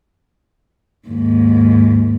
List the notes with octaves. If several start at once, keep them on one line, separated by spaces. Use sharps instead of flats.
D#2 G#2